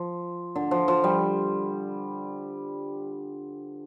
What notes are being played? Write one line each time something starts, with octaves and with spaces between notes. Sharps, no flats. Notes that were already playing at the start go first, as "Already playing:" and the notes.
Already playing: F3
D3
F3
F3
G3